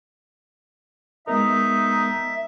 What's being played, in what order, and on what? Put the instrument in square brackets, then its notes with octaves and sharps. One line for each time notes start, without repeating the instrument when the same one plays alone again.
[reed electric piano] G#3 B3 A#4 [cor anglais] D#4 [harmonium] E5